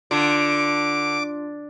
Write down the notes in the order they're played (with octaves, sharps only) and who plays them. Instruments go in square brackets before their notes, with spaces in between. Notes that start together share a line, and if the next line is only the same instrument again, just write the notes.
[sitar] D3 [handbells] D4 F4 [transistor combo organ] D6